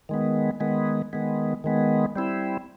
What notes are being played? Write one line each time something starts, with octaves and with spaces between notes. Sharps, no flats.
D#3 G#3 B3
D#3 G#3 B3
D#3 G#3 B3
D#3 G#3 B3
G3 C4 E4